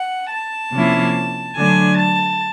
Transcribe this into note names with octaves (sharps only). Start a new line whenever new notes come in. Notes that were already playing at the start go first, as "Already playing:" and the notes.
Already playing: F#5
A5
C3 F3 A#3 C#4 E4
D3 F#3 A3 D4 G#5
A5